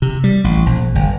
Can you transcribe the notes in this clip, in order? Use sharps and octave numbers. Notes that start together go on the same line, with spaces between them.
C3
G3
A1
A#1
G1